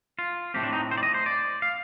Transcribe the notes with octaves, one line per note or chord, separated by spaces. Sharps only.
F4
A2 A3 C4 G4
D4
D#4
C5
D5
D#5
C5
D5
F5